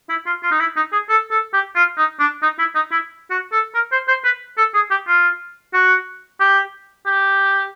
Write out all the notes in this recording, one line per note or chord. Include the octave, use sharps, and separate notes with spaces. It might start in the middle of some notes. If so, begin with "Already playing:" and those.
E4
F4
F4
D#4
E4
D#4
G#4
A4
A4
G4
F4
D#4
D4
D#4
E4
D#4
E4
F#4
A4
A#4
C5
C5
B4
A4
G#4
G4
F4
F#4
G4
G4